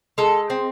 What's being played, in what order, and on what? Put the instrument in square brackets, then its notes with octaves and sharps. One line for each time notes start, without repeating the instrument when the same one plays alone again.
[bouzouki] G#3 A4
C4